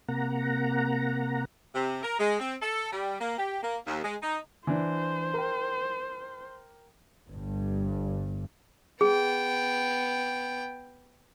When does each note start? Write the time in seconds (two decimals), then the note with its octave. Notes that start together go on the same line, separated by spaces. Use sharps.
0.08 C3 A#3 F#5 A#5
1.75 C3
2.03 A#4
2.19 G#3
2.40 C4
2.61 A4
2.92 G3
3.20 A#3
3.38 G4
3.63 A#3
3.86 D#2
4.04 G#3
4.22 D#4
4.67 E3 D4 C5
5.34 A#4 G5
7.27 G1 G2
9.01 B3 G#4 G5